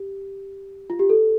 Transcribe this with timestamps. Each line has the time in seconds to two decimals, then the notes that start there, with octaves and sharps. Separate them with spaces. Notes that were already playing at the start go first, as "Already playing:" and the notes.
Already playing: G4
0.90 F4
0.99 G4
1.10 A4